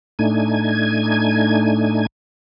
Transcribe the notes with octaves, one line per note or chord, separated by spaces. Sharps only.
A2 A3 D4 D#4 G#5 G#6